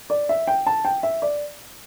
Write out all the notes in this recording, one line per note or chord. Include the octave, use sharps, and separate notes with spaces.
D5
E5
G5
A5
G5
E5
D5